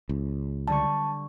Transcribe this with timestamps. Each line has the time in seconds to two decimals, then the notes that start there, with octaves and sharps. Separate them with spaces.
0.09 C#2
0.68 D3 G3 A5 C#6